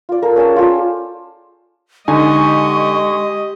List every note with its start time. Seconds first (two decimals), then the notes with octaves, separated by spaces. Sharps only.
0.09 F4 D5
0.22 A4 A#4
0.36 C#4 G#4 G5 A5
0.56 F4 A4 D5
2.08 D3 G#3 D#4 G4 D#5 G#5 C#6